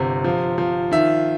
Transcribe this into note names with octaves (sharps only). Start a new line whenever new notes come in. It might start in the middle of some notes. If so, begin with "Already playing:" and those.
Already playing: G1 C3
F3
F3
D#3 E5